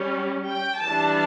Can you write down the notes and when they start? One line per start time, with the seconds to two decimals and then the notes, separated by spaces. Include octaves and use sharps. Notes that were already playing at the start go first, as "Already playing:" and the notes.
Already playing: G3 C#4
0.52 G5
0.84 E3 G3 D4 A5